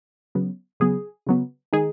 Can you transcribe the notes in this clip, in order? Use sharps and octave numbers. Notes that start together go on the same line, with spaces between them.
C#3 F#3 B3
C#3 F#3 B3 G#4
C#3 F#3 B3
D#3 G#3 D#4 G#4